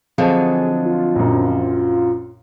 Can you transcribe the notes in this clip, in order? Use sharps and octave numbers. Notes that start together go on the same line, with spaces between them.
D3 F3 F#3 C4 G#4 D#5 A5
F4
A#1 F#2